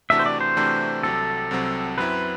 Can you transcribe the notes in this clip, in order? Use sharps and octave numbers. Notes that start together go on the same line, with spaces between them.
C3 E3 A3 D4 F#4 E5
C5
D5
C5
C3 E3 A3 D4 F#4
C2 C3 F#3 C4 A4
C2 C3 F#3 C4
F#2 F#3 C4 E4 B4